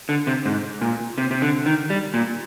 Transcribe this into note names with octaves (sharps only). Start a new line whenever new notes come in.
D3
C3
G#2
A#2
C3
C3
D3
D#3
G3
A#2